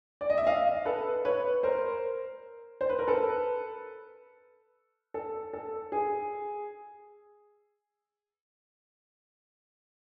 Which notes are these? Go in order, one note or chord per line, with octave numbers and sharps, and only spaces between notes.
D5
D#5
E5
D#5 F5
A4 B4
B4 C#5
A#4 C5
C5
B4
A#4
A4 B4
A4
A4
G#4